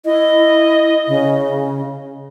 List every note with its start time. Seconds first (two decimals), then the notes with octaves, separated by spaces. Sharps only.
0.05 E4 D#5
1.08 C#3